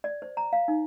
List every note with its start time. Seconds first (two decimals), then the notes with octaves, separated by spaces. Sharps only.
0.04 D5
0.22 C5
0.37 A#5
0.53 F5
0.68 D#4